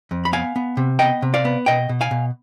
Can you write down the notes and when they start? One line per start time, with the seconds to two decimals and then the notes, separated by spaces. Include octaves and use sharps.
0.11 F2
0.25 B5
0.33 B3 F5 G#5
0.56 B3
0.77 C3
0.99 B3 D#5 G5
1.22 C3
1.34 D5 F5
1.45 B3
1.66 B2 D#5 G5
1.89 B2
2.01 F5 G#5
2.11 B2